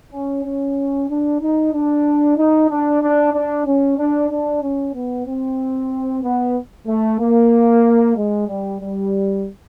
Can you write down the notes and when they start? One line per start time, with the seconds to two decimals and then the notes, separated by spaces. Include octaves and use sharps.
0.13 C#4
0.45 C#4
1.09 D4
1.41 D#4
1.74 D4
2.38 D#4
2.70 D4
3.02 D4
3.34 D4
3.67 C#4
3.98 D4
4.30 D4
4.63 C#4
4.95 B3
5.27 C4
6.24 B3
6.88 A3
7.20 A#3
8.17 G#3
8.48 G3
8.81 G3